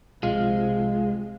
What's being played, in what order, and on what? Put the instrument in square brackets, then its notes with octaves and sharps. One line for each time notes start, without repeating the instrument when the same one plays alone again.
[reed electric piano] C2 F4 F5 [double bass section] C3 F3 [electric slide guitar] G#3